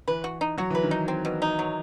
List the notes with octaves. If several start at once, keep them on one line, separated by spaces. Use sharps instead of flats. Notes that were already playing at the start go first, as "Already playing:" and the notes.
E3 B4
F#4
D#4
F#3 F#4
E3
B4
D#3
D#4
C4
B2
D#4
F#3